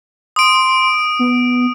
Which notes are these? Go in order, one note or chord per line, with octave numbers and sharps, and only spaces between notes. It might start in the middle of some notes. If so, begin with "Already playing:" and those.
C6 D#6 D7
B3